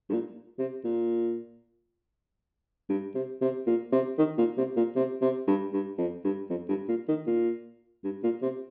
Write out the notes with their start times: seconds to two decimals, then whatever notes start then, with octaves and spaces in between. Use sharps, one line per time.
0.09 G2
0.13 A#2
0.58 C3
0.84 A#2
2.89 G2
3.15 C3
3.41 C3
3.67 A#2
3.92 C3
4.18 D#3
4.38 A#2
4.57 C3
4.76 A#2
4.96 C3
5.22 C3
5.47 G2
5.73 G2
5.98 F2
6.24 G2
6.49 F2
6.69 G2
6.88 A#2
7.08 D#3
7.27 A#2
8.04 G2
8.23 A#2
8.42 C3